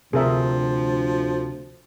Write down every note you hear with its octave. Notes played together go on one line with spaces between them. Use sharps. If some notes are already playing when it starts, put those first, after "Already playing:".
D2 C3 F3 G#4 A#4 E5